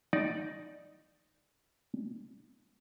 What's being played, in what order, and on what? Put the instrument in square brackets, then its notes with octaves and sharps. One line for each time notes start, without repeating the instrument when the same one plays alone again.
[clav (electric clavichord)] D#4 D5